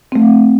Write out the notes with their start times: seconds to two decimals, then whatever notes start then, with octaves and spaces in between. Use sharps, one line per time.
0.12 C4
0.15 A3